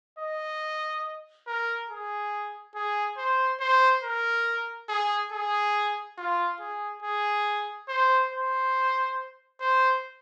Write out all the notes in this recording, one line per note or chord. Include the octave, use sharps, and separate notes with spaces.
D#5
A#4
G#4
G#4
C5
C5
A#4
G#4
G#4
F4
G#4
G#4
C5
C5
C5